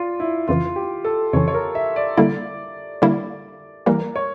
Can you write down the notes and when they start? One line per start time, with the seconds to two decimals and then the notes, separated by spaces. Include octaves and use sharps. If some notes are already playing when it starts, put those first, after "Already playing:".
Already playing: F4 D5
0.20 E4
0.48 F2 C#3 E3 F4
0.76 G4
1.04 A4
1.33 F2 C#3 E3 C#5
1.48 C#5
1.54 A#4
1.75 E5
1.96 D5
2.17 D3 G3 A#3 E4
3.02 D3 G3 A#3 E4
3.86 E3 G3 A#3 A#4
4.16 C#5